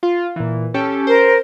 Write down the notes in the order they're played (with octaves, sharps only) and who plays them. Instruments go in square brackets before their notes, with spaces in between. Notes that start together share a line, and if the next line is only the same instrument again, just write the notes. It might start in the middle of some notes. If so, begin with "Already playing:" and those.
[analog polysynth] F4
A#2 E3
C#4 G4 A4
[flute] A#4 [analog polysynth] C5